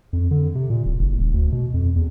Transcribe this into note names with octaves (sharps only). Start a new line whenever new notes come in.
F2
D3
C3
A#2
D1
F#1
D#1
D2
B2
F2
E2